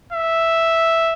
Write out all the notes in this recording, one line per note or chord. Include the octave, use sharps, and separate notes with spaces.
E5